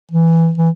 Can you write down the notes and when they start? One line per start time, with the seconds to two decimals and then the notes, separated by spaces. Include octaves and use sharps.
0.11 E3
0.58 E3